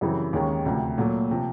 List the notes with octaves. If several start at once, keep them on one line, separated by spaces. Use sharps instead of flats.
F#2 C#3 E3 G3 C4
D#2 D#3 G#3 C#4
D2 C3 F3
A#2 F#3 A3
C3 F3